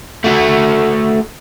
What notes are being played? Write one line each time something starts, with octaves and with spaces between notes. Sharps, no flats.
A3 F#4